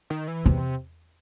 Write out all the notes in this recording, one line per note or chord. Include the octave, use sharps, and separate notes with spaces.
D#3
E3
E2 C3